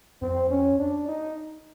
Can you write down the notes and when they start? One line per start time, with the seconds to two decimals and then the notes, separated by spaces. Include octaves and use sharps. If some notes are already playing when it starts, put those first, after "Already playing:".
0.22 F2 C4
0.50 C#4
0.79 D4
1.08 D#4